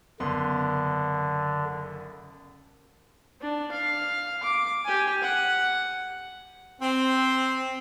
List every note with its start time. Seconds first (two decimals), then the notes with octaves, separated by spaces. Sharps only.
0.20 F#1 D3 B3 C6
3.41 D4
3.72 F5
4.43 D6
4.85 G4 G#5
5.22 F#5
6.81 C4